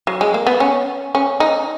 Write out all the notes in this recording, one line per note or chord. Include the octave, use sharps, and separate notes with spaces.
F#3
G#3
A#3
B3
C#4
C#4
D#4